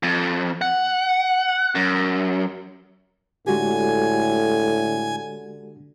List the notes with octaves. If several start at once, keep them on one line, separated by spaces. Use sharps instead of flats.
F2
F#5
F#2
A2 D3 G#3 F#4 G4 G#5